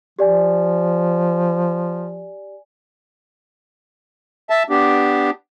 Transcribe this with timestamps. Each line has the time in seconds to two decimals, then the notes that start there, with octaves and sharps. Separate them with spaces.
0.19 F3 G4 D5 G#5
4.50 E5 A5
4.70 B3 D4 G4